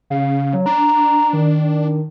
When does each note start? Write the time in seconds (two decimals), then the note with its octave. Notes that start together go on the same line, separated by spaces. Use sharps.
0.10 C#3 F5
0.53 F#3
0.66 D4 A#5
1.33 D#3